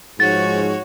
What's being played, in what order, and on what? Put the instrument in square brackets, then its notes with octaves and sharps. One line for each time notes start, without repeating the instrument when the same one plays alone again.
[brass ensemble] G#2 F3 [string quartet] F#4 C#5 [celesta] A6